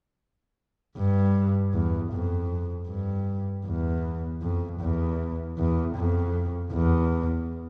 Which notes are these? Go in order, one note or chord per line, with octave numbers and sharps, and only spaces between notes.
G2
E2
F2
G2
E2
F2
E2
E2
F2
E2